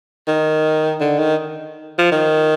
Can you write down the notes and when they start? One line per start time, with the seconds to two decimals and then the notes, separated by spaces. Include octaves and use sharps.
0.28 D#3
1.00 D3
1.19 D#3
1.98 F3
2.11 D#3